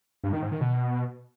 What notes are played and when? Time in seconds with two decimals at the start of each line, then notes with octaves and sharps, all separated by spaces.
0.24 G2
0.33 D#3
0.42 G#2
0.52 D#3
0.61 B2